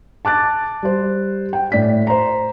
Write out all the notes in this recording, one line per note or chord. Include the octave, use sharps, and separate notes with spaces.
A5 D6 F#6 A6
G3 C5
G5
A2 D5 B6
C5 A#5